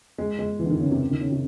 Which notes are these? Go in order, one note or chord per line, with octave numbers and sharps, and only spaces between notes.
G#3
G#3
E3
D3
D#3
C#3
C3
D#3
C#3
C3